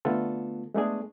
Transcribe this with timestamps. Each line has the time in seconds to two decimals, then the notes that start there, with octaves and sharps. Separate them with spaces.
0.05 D3 A3 B3 F4 A4
0.74 G#3 A3 B3 D4 G#4